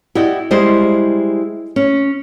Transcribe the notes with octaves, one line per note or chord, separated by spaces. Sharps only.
E4 F#4 G4 D5 D#5
G3 G#3 E4 C5 D#5
C#4